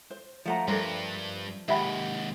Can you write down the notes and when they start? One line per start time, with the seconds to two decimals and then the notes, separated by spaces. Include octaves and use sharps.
0.10 C5
0.46 F3 A3 F5 F#5 A#5
0.68 G2 G3 D4 A4 A#4 C5
1.68 D#2 G#2 G4 E5 F#5 G5 B5